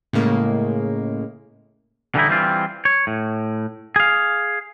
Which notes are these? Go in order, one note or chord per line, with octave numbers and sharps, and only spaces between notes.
A2 C#3 G#3 A#3
D3 E3 G3 C#4 D#4 E4
E3 G3 C4 F4
C#5
A2
G#4 F5